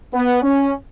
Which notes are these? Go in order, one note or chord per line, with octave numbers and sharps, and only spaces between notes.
B3
C#4